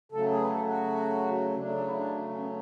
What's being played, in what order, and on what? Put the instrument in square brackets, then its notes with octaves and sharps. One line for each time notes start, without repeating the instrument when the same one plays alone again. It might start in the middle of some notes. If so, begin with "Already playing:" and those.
[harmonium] C#3 F#3 A3 A4
G#4
B4
A4
F#4
C#3 F#3 A3 D4
F#4
E4
D4
C#4
B3
C#4